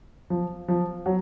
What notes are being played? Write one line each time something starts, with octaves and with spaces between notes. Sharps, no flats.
F3
F3
F#3